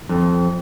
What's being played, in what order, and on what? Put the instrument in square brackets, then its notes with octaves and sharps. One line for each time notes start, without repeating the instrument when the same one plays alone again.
[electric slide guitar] F2